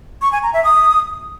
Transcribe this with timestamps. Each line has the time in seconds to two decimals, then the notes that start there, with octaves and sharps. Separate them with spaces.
0.22 C#6
0.32 G#5
0.43 A#5
0.53 E5
0.64 D#6